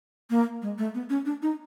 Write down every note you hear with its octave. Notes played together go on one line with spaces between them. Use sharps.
A#3
G#3
A3
B3
C#4
D4
D#4